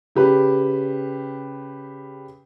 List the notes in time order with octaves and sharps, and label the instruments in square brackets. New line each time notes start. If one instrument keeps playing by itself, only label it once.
[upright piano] C#3 G4 B4